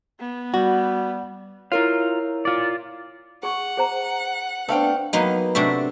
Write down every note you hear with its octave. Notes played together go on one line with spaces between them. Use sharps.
B3
G3 F#4 F#5
E4 F4 A#4 C#5 F5
F4 D5
G#4 F#5 C#6
G#4 C5 A#5
A3 B3 C4 D4 F5 G5
F#3 A#3 B3 D#4
C3 A3 D4 F#4 E5